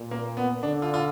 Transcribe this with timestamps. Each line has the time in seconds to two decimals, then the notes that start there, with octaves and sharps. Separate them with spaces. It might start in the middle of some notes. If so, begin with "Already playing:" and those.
Already playing: A#2
0.11 A#3
0.37 B3
0.63 D3 D4
0.82 F4
0.94 F4